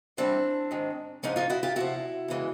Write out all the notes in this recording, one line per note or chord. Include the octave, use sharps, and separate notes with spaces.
A2 E3 G3 C4 D4
G#2 D#3 G#3
G#2 F3 G#3 C#4 D#4
D#4 F4
E4 F#4
F4 G4
E2 C3 F3 E4 F#4
E2 C#3 E3 G#3